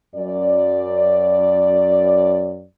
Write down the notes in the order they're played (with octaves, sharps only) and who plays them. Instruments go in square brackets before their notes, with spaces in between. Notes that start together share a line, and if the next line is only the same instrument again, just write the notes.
[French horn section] F#2 D5